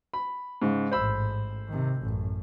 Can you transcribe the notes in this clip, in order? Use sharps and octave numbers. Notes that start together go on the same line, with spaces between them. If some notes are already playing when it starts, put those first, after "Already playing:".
B5
G#2 C#3
A1 G#2 C5 B5 E6
C3 D#3
A1 F#2